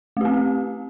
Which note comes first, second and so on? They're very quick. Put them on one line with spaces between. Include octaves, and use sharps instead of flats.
A3 G4 C4